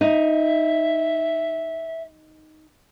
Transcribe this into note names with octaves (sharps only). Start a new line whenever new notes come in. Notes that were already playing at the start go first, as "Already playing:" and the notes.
D#4 E5